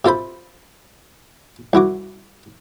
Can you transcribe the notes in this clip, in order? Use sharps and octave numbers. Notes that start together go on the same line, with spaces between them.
C3 F4 A4 C5 B5
C2 E4 F#4 D6